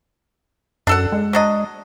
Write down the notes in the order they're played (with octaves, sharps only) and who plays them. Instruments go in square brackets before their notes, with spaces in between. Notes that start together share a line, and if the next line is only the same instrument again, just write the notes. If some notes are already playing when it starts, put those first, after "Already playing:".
[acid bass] F#2 [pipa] D4 A4 F#5
[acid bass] G#3
[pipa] F#3 D4 D#5